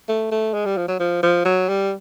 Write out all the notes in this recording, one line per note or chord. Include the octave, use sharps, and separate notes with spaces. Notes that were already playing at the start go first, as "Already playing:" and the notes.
A3
A3
G#3
G3
F3
F#3
F3
F3
F#3
G3